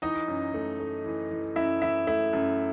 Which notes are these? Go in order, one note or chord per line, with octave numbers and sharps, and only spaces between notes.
E3 D#4 D#5
F#2
A3
A3
E3
E3
F#2 E4 E5
E3 E4 E5
A3 E4 E5
F#2